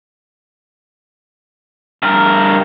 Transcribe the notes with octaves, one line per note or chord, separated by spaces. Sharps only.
G2 A#4